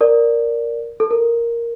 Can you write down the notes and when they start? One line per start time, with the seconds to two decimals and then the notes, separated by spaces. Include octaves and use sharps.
0.01 A#4 D5
1.00 A4
1.11 A#4